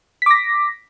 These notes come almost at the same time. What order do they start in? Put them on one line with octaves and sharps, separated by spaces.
B6 D6 A#6